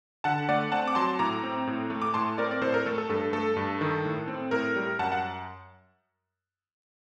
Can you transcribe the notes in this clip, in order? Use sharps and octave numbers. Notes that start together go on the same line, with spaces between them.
D3 F#5 A5
A3 D5 F#5
C4 F#5 A5
D6
F#3 A5 C6
A2 A#5 D6
C4
A2
A3
D6
A2 A5 C6
C4 A#4 D5
D5
A2 A4 C5
A#4
A3 A4
A4
G2 A4
A3 A4
G2
D#3
A2
C4
A2 A#4
G3
F#2 F#5 A5
F#5